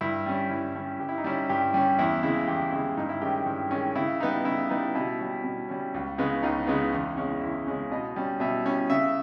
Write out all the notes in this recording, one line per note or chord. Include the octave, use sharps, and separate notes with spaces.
G2 E4
G3 C#4
G2 E4
G3 C#4
G2 G4
E4
D#4
G3 C#4 E4
G2 G4
G3 C#4
E2 E4
C#3 G#3 E4
E2 G4
C#3 G#3 E4
G2 D#4
E4
D#3 G#3 C#4 G4
G2
D#3 G#3 C#4
C#3 E4
G3 B3 D#4
C#3 E4
G3 B3 D#4
B2 E4
G3 C#4
B2
G3 C#4
C#2
C#3 G#3 B3
C#2 D#4
C#3 G#3 B3
E2
C#3 G#3 C#4
E2 E4
C#3 G#3 C#4
B2 D#5
G3 C#4
B2 E5
G3 C#4
C#3 E5